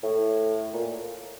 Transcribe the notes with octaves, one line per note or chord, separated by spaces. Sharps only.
A2
A#2